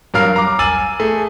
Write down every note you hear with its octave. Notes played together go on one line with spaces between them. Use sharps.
G2 F#3 A#4 F5 F6 C7
A#5 D6
G#5 E6 A6 D#7 F#7
A3 G#4